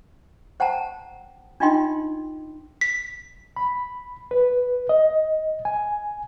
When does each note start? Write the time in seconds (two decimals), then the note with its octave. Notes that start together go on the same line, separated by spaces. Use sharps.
0.60 C5 F#5 G5 A5 A#5
1.60 D4 D#4 F4 D#5 G5 C6
2.81 B6
3.56 B5
4.31 B4
4.89 D#5
5.65 G#5